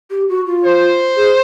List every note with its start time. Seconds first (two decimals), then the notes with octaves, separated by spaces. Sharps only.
0.10 G4
0.29 F#4
0.46 F4
0.64 C5
1.16 G#4